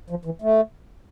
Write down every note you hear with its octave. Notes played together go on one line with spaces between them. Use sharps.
F3
E3
A3